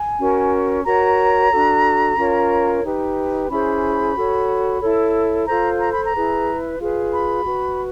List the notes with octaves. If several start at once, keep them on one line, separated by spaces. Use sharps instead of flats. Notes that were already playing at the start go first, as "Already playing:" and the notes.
Already playing: G#5
C#4 F#4 A#4
F#4 A#4 C#5 A#5
D4 F#4 A4
C#4 F4 A#4 C#5
D#4 G4 B4
C#4 E4 G#4 C5 B5
F#4 A4 C#5
E4 A4 C#5
F4 A4 C5 A#5
A#5
B5
A#5
E4 G#4 B4
F4 G#4 B4
B5
F#4 B4